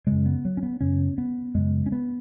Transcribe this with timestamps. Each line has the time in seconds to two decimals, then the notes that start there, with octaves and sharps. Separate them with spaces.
0.07 F#2 C#3 G#3
0.26 B3
0.45 F#3
0.57 C#4
0.63 B3
0.81 F#2 C#3 C#4
1.18 B3
1.54 F#2 C#3 G#3
1.86 C#4
1.92 B3